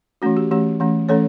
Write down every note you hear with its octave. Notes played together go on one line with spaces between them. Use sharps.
E3 A3 C#4 F#4
G4
E3 A3 C#4 G4
E3 A3 C#4
E3 A3 C#4 A4 C#5